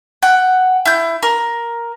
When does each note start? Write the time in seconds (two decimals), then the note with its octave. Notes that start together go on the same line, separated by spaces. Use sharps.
0.22 F#5 G5
0.85 E4 G6
1.23 A#4